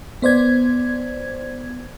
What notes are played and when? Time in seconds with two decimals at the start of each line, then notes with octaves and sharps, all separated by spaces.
0.22 B3 C5 D5 G#6